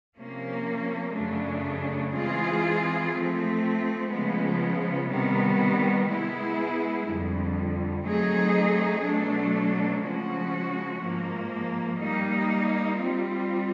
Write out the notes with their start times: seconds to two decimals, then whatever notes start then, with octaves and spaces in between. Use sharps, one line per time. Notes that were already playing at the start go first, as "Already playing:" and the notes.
0.18 C3 F3 A#3 C#4
1.15 F#2 C#3 F#3 A3 D4
2.14 E3 G#3 C4 F4 G#4
3.13 F3 A3 C4
4.12 C#3 F3 G#3 B3
5.10 C3 D#3 G3 B3
6.09 G#3 B3 E4 G#4
7.07 F2 D3 G3
8.05 F#3 A3 C4 D#4 G#4
9.04 B2 F#3 A3 D4
10.03 C#3 F3 G#3 C#4 F#4
11.01 G#2 F3 A#3
12.00 G3 A#3 D#4
12.98 G3 C4 F4